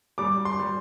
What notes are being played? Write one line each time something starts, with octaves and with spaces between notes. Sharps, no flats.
G3 D6
C6
G3